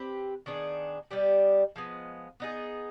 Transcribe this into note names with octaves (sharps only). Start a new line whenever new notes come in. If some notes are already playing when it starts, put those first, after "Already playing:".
Already playing: C4 G4 B4
D#3 B3 D4 G#4
G3 B3 D4 G4
F3 G#3 B3
B3 D#4 G#4